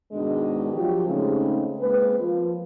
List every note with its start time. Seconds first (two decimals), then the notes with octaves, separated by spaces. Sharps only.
0.12 G#2 B2 D#3 G#3 D4
0.73 F3 F#3 F4 G4
1.05 C#3 G#3 A3 C4 C#4 D#4
1.77 G#3 A#3 C4 B4
2.17 F3